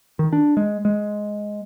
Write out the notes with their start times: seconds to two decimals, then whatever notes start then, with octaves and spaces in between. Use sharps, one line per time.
0.19 D#3
0.33 D4
0.57 G#3
0.85 G#3